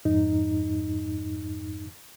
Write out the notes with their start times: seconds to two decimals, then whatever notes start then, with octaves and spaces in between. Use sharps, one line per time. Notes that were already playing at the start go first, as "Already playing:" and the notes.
0.05 F2 G#2 D#4